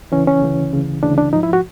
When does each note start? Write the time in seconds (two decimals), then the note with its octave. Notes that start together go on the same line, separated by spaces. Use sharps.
0.12 D2 C#3 E3 C#4
0.27 C#4
0.42 D2 C#3 E3
0.73 D2 C#3 E3
1.03 D2 C#3 E3 D4
1.18 D4
1.33 G#2 F3 D#4
1.43 E4
1.53 F#4